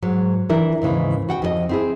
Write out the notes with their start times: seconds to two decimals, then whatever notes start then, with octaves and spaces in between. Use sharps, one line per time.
0.02 G#2 F#3
0.50 E3 D4 E4 A#4
0.82 D#2 G#2 C#3 E3
1.29 F#4 F#5 G5
1.42 F2 F#4 D#5
1.69 C4 E4 G#4